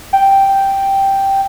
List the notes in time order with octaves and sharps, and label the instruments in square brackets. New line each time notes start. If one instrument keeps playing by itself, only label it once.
[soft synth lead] G5